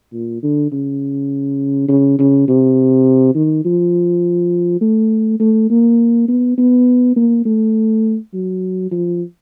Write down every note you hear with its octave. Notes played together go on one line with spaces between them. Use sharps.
A#2
D3
C#3
C#3
C#3
C3
D#3
F3
A3
A3
A#3
B3
B3
A#3
A3
F#3
F3